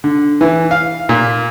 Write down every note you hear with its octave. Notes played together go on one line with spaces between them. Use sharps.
D3
E3
F5
A#2